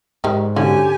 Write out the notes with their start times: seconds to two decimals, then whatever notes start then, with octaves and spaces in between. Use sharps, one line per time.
0.24 G#2 D#3 G3
0.56 D3 C#4 F#4 G4 G#5